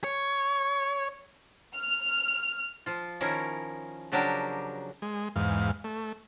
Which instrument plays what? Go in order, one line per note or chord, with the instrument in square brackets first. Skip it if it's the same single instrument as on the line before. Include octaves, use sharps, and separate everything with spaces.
[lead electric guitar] C#5
[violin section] F6
[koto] F3 F4
D#3 F3 C#4 E4 A#4
C#3 F3 F#3 D4 G4 A#4
[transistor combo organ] G#3
E2 G#2 F5
A3